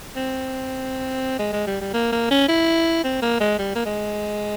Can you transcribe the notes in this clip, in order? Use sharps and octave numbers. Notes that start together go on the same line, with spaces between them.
C4
G#3
G#3
G3
G3
A#3
A#3
C#4
E4
C4
A#3
G#3
G3
A#3
G#3